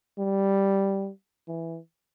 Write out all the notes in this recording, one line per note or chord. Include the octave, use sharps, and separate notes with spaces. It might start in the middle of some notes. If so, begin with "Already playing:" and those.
G3
E3